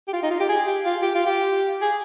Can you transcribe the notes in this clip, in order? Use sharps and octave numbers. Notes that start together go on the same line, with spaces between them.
G4
F4
D#4
F4
G4
G#4
G4
F4
G4
F4
G4
G#4